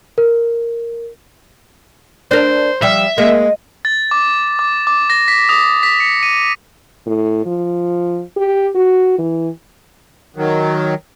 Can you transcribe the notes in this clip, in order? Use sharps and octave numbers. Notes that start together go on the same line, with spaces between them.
A#4
D4 A#4 C5
F3 G3 E5
G#3 A#3 D#5
A6
D6
D6
D6
A#6
B6
D#6
B6
C#7
D#7
A2
F3
G4
F#4
E3
D#3 F#3